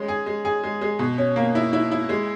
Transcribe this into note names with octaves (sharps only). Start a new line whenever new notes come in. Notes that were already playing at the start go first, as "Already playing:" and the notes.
Already playing: G#3 C#4
G#4
G#3
G#4
G#3
G#3
B2
C#4
A#3
E4
E4
E4
G#3